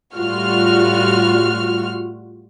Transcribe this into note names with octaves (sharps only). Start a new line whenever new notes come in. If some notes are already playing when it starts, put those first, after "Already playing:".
A2 G3 F4 F#4 F6